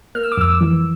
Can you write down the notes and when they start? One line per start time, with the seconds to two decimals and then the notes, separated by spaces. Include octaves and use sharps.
0.15 A#3 F6
0.23 E6
0.32 D6
0.37 F2 E6
0.61 E3